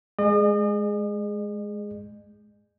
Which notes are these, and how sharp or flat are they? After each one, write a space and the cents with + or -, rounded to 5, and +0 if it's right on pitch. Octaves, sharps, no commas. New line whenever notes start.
G#3 +5 G#4 +0 D#5 -40